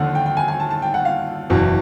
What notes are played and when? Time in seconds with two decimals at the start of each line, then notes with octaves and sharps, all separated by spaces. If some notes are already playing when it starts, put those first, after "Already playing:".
Already playing: D#2 D3 F3 F#5
0.15 G5
0.26 G5
0.37 G#5
0.48 G#5
0.60 A5
0.71 A5
0.82 G5
0.94 F#5
1.05 F5
1.50 F#1 E2 B2